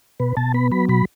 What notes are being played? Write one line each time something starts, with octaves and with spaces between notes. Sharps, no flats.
B2 B4
B2 A5
B3 B5
F#3 B5
B2 B5